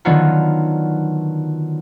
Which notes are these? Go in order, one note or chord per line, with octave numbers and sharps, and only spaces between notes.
D3 D#3 F#3 B3 F4 F#4